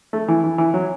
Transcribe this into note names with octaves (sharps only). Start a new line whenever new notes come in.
A3
E3
E3
E3
F#3